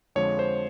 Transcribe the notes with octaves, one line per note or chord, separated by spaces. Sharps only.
F2 D3 F3 G#3 C#5
C5